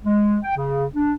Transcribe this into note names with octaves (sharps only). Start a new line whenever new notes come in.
G#3
G5
C#3
D4